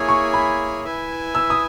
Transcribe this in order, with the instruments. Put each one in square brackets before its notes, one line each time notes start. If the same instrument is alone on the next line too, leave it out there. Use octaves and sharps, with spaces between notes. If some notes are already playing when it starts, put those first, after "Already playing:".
Already playing: [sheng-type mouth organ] A#3 E4 G#4 C#5 G#5
[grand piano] C#6
B5
[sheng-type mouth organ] E4 B4 E5 G#5
[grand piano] E6
D#6